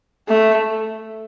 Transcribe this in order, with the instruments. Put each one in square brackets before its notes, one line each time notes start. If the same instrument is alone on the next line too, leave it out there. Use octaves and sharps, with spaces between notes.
[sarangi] A3